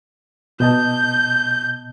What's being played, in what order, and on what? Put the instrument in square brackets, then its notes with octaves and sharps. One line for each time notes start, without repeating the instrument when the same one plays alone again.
[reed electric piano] B2 D#5 A5 [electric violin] G6